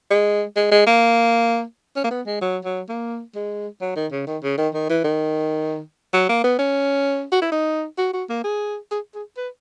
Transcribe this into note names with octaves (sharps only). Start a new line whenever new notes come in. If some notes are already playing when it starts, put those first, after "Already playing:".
G#3
G#3
G#3
A#3
C#4
A#3
B3
G#3
F#3
F#3
A#3
G#3
F#3
D#3
C#3
D#3
C#3
D#3
D#3
E3
D#3
F#3
A#3
B3
C#4
F#4
E4
D#4
F#4
F#4
A#3
G#4
G#4
G#4
B4